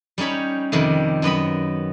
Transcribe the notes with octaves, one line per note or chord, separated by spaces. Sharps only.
G3 C#4 D#4 C#5 B5
F2 C3 D#3 G3
F#2 B3 D#5 B5